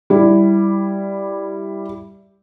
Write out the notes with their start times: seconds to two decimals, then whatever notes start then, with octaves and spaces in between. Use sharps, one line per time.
0.10 G3 E4